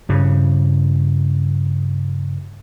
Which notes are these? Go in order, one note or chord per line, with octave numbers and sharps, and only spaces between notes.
G2 C#3